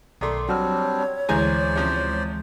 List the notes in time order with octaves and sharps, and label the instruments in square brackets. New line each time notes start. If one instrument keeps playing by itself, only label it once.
[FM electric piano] B1 D5 C6 [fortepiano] D#3 A3
[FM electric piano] F#3 [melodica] G3 C4 D4 [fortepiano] F#4 F6 [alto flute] C#5
[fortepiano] A1 G#5 A#5 [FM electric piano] D2 E3 G#3 [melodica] C5 D5
[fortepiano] C3 F3 C#4